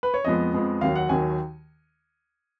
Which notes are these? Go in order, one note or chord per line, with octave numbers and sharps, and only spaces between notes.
B4
C#5
F2 F3 G#3 B3 D#5
F2 F3 G#3 B3
D#2 D#3 F#3 F5
F#5
D#2 D#3 F#3 G#5